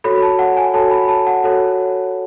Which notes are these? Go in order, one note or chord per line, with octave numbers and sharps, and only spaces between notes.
F#4 A4 C#5 B5
A5
F#5
G#5
F#4 A4 C#5 A5
B5
A5
F#5
F#4 A4 C#5